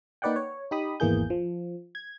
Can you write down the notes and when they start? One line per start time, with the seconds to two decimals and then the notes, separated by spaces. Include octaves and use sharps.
0.22 A#3 D#4 B4 D5 F#5 G5
0.36 C#5
0.71 D#4 G4 B5 D#6
1.00 G#1 E2 E3 A#3 G#4 G6
1.30 F3
1.95 G#6